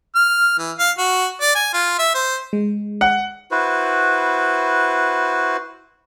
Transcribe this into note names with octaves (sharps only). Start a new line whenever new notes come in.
F6
E3
F5
F#4
D5
G#5
F4
E5
C5
G#3
F#5
E4 F#4 B4 C5